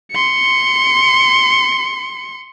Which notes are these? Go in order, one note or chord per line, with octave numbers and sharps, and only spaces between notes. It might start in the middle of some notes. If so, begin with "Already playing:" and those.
C6 C#7